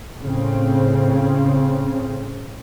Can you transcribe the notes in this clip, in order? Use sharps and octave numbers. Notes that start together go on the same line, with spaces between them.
A2 C#3 C4